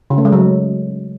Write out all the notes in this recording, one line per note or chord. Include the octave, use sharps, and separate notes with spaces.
C#3
A3
G#3
F#3